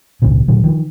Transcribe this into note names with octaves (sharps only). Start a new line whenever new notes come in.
G#1 C#2 A#2 C#3
A#2 D3 F#3
D#3 F3